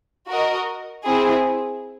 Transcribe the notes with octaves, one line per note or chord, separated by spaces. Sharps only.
F#4 A#4 D#5
C4 E4 G#4